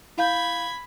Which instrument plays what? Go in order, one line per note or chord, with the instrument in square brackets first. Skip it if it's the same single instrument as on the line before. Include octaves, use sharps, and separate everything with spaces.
[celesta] E4 F5 G6 [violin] B5 G#6